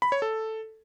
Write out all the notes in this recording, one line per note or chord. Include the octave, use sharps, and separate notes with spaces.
B5
C#5
A4